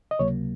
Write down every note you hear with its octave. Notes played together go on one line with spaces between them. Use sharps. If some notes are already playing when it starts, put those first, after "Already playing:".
D#5
C#2 C3 F#3 A#3 C#5